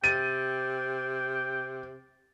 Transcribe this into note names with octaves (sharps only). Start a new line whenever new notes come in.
C3 G5 A6 D#7